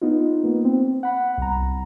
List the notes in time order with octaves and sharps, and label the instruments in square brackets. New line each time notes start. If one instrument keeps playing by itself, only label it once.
[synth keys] B3 D#4 F4
A#3 B3
C4
F#5 B5
C2 A#5